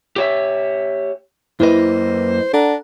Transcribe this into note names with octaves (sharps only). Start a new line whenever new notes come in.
G4 C#5 E5
F#2 A#3 E4 B4 C5 D#5
D4 A4 F#5 A#5